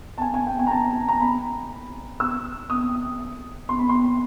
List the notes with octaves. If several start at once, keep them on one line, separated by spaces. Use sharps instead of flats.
A5
G#5
G#5
G5
G#5
A#5
A5
A#5
B5
E6
D#6
C6
B5
C6